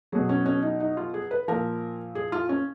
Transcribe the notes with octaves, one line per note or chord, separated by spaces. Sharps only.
B2 F#3 G#4
C#4
C#4
D#4
D#4
F4
G#4
B4
A#2 F3 A#4
G#4
F4
C#4